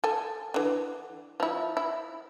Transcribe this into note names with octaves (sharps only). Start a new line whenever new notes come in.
A4 G#5
D3 E3
F3 E4
E4